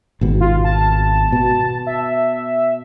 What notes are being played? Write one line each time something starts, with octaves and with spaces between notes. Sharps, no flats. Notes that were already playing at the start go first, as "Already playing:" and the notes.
G#1 B2
F4
A5
B2
E5